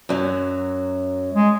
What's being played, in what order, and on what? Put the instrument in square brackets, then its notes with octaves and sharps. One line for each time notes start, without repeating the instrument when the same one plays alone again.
[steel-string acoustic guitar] F#2 F#3
[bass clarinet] G#3